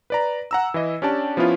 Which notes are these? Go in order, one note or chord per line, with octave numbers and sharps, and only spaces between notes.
B4 D5 A#5
F#5 A#5 E6
E3 E4 D#5
C#4 D4 G4 D5 A5
F3 B3 C#4 E4 F4